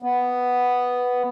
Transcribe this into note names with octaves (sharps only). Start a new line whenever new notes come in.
B3